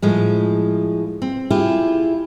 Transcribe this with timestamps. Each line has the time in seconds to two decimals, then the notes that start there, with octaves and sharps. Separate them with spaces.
0.02 A2 F3 G#3
1.22 C4
1.50 E4 F4 G4 G#4